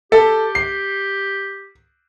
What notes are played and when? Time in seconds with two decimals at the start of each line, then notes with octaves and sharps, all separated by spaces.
0.12 G4 A4
0.55 C7